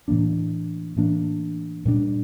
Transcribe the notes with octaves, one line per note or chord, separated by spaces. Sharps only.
A2 E3 A#3 D4
A2 E3 A#3 D4
A#2 G3 D4